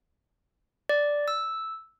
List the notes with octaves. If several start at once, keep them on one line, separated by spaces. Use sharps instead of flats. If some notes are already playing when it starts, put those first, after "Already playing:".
D5
E6